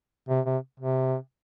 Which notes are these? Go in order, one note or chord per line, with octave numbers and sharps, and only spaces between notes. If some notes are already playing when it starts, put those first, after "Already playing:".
C3
C3
C3